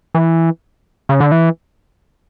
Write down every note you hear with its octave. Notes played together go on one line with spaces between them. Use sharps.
E3
C#3
D3
E3